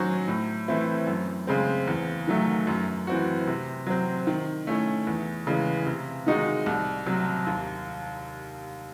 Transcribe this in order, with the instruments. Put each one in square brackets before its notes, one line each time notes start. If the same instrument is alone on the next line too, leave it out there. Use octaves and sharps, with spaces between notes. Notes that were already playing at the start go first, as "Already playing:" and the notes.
Already playing: [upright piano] D#3 F#3 C#4 F#4 C5
A2
E3 A3 C4 E4
F#2
C#3 G#3 C4
E2
D#3 F#3 A3
F#2
E3 C4 F#4
C3
F#3 C4
D#3
A3 C#4 E4
E2
C#3 E3 G#3
C3
D#3 G#3 D#4 F#4
C2
C3 F#3
D#2